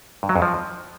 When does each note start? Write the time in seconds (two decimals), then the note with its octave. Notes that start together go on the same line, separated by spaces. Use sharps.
0.23 G2
0.29 F#3
0.36 F2
0.42 F3